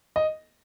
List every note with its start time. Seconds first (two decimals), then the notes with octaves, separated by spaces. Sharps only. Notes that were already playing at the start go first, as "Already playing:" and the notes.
0.16 D#5